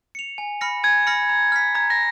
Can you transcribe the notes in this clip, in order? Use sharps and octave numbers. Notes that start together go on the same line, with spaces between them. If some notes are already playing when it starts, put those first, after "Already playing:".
C#7 F7
G#5
B5 F6 A#6 C#7
G#5 G#6
B5 F6 A#6 C#7
A#5
F6 B6
A#5 G#6
A#6